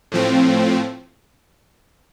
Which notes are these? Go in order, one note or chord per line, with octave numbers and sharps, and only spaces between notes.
A2 F3 C4